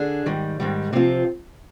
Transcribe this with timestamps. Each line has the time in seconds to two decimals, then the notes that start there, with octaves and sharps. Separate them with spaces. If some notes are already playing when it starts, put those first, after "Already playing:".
Already playing: D3 D4 G#4
0.26 G#2 D#3 G3
0.60 G#2 D#3 G3
0.93 C3 F3 C4 F4